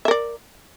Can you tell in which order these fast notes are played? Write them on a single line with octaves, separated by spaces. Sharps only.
E5 A#4 D5